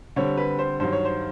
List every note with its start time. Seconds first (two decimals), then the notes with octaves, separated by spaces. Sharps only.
0.16 D3 G3 C4 C#5
0.38 B4
0.59 C5
0.80 G2 D#3 F#3 C5
0.92 C#5
1.05 C5